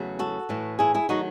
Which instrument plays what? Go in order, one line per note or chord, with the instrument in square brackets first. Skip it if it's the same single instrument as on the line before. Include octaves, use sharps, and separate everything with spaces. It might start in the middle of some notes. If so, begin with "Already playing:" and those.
Already playing: [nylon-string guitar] E2 C#3 F#3 A3
F#4 A4
A2 E3 A3
E4 G#4
E4 G#4
D#3 F#3 A3 D#4 F#4